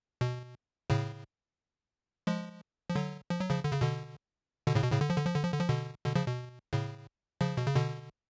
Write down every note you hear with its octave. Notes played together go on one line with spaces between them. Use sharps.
B2
A2 C#3
F3 G#3
F3
D3 F#3
F3
F#3
C#3 F3
D3
C#3
B2 D3
B2 D3
A2 C#3
B2
A2 C#3
D3
F3
D3
F3
D3
F3
D3
F3
B2 D3
B2 D3
C#3 F3
B2
A2 C#3
C#3 F3
B2
C#3
B2 D3